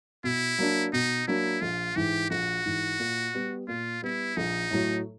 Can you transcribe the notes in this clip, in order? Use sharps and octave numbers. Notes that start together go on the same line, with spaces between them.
B2 E4
F#3 A#3 D4
B2 D#4
F#3 A#3 D4 E4
A#1 F4
G#2 E3 G4
A#1 F#4
G#2 E3
A#2
G3 B3
A#2 F4
G3 B3 E4
A#1 D#4
A2 F#3 A3